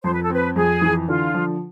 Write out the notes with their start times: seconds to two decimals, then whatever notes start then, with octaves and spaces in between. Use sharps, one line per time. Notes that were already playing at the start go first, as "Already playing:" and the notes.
0.03 F2 C5
0.14 B4
0.23 A4
0.30 C4 B4
0.56 F2 G#4
0.82 E3
1.08 D3 F4
1.34 F3